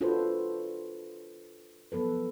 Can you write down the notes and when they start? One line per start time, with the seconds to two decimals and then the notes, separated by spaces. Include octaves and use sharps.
0.01 D4 F4 F#4 A4 B4 C5
1.92 F3 F#3 B3 A4 B4